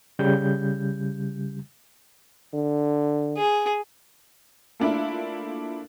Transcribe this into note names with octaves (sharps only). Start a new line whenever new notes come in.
C#3 G3 G6
D3
G#4
A3 A#3 D4 E4 F4 E5